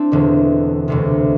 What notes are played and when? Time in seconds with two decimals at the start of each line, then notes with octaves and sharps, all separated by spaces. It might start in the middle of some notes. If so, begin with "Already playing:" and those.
Already playing: C4 D4 E4
0.12 E1 E2 D3
0.88 E1 D2 C3